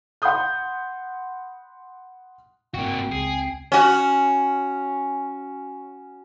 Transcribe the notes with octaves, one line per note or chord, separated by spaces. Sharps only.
F#5 B5 C6 D#6 G6
G#1 A#3 C4 F#4 G5
C#2 G#4 C7
C#4 F#4